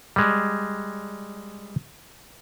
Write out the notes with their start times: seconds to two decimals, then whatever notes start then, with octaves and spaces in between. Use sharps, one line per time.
0.16 G3 G#3